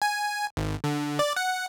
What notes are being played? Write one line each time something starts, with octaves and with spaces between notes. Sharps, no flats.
G#5
G#1
D3
D5
F#5